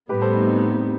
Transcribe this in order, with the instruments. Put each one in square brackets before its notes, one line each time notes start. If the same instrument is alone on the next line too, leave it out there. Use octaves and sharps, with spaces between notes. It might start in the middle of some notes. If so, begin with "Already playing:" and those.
[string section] A2 G3 B3 [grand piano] G4 B4
[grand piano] A4 C5
D#4
C4
D#4
D#4
C4